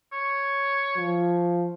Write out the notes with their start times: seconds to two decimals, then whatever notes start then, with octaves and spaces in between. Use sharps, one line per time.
0.13 C#5
0.97 F3